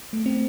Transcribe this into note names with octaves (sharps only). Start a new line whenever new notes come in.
A3
C4